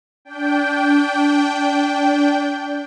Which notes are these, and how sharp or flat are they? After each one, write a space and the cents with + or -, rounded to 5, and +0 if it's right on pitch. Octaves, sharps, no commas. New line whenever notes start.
D4 -30 G5 +0